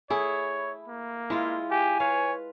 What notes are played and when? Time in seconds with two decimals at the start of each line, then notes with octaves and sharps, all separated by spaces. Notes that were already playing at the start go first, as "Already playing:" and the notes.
0.10 A3 E4 G#4 C#5
0.88 A#3
1.30 G#3 E4 F4
1.71 G4 G#5
2.00 B4 C#5 F5